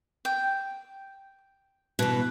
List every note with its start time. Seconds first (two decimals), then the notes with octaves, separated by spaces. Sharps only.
0.25 G5
1.99 B2 E3 B4